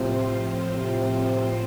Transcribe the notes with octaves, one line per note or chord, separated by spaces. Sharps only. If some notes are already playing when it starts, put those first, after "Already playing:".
Already playing: A2 C3 F3 C4 F4 C5
C3